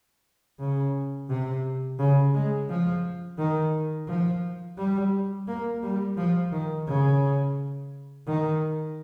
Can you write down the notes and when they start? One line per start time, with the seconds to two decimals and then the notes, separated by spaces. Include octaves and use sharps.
0.59 C#3
1.29 C3
1.99 C#3
2.34 G#3
2.69 F3
3.38 D#3
4.08 F3
4.77 G3
5.47 A#3
5.82 G3
6.17 F3
6.52 D#3
6.87 C#3
8.27 D#3